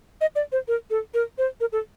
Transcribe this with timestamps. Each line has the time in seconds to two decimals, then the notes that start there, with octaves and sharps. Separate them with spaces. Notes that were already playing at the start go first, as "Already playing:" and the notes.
0.21 D#5
0.35 D5
0.52 C5
0.68 A#4
0.90 A4
1.14 A#4
1.38 C5
1.60 A#4
1.72 A4